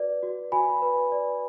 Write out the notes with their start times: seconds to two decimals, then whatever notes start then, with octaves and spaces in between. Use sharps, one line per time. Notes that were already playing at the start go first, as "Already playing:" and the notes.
Already playing: F#4 B4 D5
0.23 F#4
0.52 F#4 G#5 B5
0.82 B4
1.12 D5